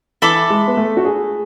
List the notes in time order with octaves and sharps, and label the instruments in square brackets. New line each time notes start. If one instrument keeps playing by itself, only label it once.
[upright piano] E3 [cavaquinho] A4 E5 B5 D6
[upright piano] G#3
B3
A3
F#4
G#4